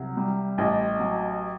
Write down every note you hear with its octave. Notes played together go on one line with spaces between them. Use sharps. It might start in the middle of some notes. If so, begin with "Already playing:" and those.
Already playing: C2 F#3
G3
A1 D#5
F#3